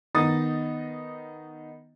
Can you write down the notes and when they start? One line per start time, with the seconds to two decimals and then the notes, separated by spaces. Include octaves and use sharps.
0.15 D#3 B3 D#4 D#5 D#6 A6